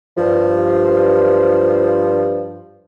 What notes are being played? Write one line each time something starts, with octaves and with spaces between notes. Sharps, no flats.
G2 F3